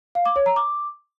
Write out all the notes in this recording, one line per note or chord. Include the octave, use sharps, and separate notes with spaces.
F5
D6
C#5
A#5
D6